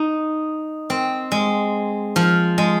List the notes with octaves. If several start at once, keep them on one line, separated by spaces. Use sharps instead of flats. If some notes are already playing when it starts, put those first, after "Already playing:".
Already playing: D#4
C4
G#3
F3
G#3